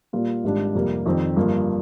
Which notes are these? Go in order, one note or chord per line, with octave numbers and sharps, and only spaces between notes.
A#2 G3 A#3 F4
G#1 G#2 G3 D4
F2 C3 G3 A#3
F2 D#3 G3 C4
G1 G2 F3 A#3